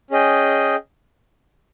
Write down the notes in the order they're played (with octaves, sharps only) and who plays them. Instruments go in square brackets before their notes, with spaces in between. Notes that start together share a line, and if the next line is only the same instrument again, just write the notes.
[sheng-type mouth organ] C#4 G#4 D#5 G5